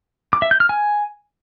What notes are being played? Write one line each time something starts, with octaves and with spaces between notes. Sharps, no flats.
D6
E5
G6
F6
G#5